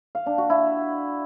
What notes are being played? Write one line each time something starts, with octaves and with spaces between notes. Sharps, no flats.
F5
D4
F#4
E4